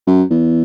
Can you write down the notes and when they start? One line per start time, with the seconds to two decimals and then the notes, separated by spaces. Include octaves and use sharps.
0.07 F#2
0.30 E2